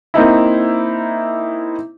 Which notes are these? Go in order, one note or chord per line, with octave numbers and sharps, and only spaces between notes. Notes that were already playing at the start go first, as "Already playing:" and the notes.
A#3 C4 D#4 E4